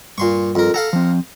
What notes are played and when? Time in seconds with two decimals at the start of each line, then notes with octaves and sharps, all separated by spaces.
0.18 G2 A#2 C6 C#6
0.55 F2 A#4
0.74 A4 F5 F#5 A#5
0.93 F3 C4